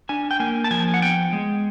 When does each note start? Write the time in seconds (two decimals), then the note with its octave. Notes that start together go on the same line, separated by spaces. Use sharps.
0.09 D4 G#5
0.31 G5
0.40 A#3 G#5
0.64 A5
0.71 F3 G#5
0.94 F#5
1.02 B3 G5
1.33 G#3